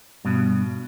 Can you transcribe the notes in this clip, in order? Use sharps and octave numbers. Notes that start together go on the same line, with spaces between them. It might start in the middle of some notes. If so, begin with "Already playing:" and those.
G2 B2